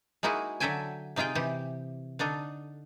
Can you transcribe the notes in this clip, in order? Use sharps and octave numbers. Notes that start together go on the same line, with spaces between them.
G#3 A#3 D#4 E4 F#4 G#4
D3 F#3 A4 E5 G5 G#5
C3 D#4 F4 G#4 G5
C3 E3 G4
D3 D4 D#4 A4